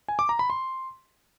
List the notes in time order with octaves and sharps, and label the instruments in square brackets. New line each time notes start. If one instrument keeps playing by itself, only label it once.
[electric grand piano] G#5
D6
A#5
B5
C6